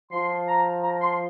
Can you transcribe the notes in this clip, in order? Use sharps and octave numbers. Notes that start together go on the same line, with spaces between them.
F3 C6
A#5
A#5
C6